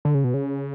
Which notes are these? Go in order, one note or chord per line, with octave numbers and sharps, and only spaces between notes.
D3
C#3
B2
C#3